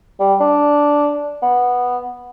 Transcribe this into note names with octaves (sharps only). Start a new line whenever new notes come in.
G3
D4
B3